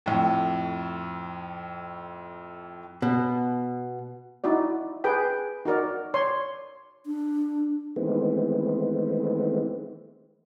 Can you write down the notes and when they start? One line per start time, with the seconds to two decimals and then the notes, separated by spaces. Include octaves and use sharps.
0.06 F2 A2
3.02 B2
4.44 D#4 E4 F#4 D5
5.04 G#4 B4 G5
5.65 D#4 F#4 A#4 D5
6.14 C#5 D5 C6
7.06 D4
7.96 D#3 E3 G#3 A3 B3 C4